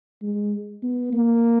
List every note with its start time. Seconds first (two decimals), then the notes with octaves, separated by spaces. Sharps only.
0.22 G#3
0.83 B3
1.13 A#3